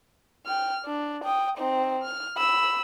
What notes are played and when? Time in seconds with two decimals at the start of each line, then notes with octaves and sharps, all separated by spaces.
0.46 G5 F6
0.85 D4
1.24 G5 D#6
1.58 C4 D#4
2.02 F6
2.37 B5 E6